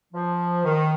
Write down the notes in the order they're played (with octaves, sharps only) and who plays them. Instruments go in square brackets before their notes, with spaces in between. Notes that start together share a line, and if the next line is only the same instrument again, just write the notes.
[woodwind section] F3
D#3